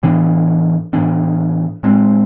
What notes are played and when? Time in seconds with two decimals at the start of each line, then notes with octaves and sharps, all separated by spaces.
0.03 A2 E3 B3 D4
0.93 A2 E3 B3 D4
1.83 A2 G#3 C4